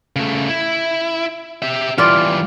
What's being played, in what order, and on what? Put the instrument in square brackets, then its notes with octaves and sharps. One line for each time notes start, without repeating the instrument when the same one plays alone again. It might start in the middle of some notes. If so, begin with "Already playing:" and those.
[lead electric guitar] C#3 A3
E4
G4 E5
[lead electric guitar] E3 G3 [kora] F4 D5